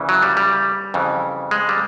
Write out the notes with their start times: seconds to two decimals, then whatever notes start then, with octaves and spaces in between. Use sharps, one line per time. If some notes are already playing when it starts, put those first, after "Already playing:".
Already playing: D2 C#3 E3
0.09 F#3
0.23 G3
0.37 G3
0.94 F2 C#3 E3
1.51 G#3
1.69 G3